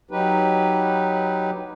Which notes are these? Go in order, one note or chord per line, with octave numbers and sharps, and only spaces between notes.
F#3 D#4 G4 B4